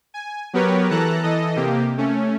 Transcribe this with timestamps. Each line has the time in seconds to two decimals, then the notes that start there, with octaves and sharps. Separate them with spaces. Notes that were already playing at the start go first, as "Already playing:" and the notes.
0.14 G#5
0.53 F#3 B3 G4 A#4 B4 C#5
0.91 E3 A4 A5 A#5 F#6
1.23 E3 A4 D#5
1.56 C3 A#3 G4
1.98 A3 C#4